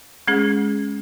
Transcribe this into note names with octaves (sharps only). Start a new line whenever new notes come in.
G#3 C#4 G#4